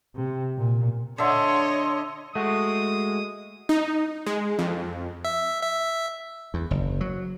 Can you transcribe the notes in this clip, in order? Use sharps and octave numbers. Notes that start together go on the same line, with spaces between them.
C3
A#2
D3 C#5 D#5 E5 C6
G#3 A3 F#4 D#6
D#4
G#3
F2
E5
E5
E2
F#1
F#3